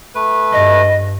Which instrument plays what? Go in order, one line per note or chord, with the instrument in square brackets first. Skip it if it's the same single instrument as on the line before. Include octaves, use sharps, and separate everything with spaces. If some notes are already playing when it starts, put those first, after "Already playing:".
[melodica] A3 B4
[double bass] G2 [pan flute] D#5